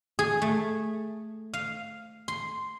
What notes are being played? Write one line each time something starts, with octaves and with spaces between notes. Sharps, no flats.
G#4
A3
F5
C6